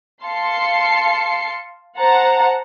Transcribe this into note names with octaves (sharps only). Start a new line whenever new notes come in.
F5 A5 C6 C7 C#7
C5 F#5 A5 A#5